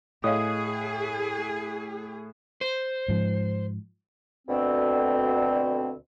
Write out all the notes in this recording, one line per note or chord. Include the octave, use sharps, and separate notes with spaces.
A2 G#4 C#5 D#5 F5 D#6
C5
G#2 F3
D2 B2 D3 C4